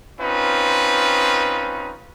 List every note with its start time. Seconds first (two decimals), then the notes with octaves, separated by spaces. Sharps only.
0.20 C4 C#4 D#4 F4 B4